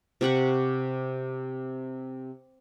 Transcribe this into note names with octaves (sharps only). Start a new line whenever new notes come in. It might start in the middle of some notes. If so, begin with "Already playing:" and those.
C3 G4 F#5 C#6